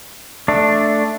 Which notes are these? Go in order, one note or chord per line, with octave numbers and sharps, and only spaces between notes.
A3 D4